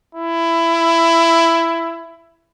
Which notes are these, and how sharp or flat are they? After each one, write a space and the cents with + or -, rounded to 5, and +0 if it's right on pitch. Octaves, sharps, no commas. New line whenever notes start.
E4 +15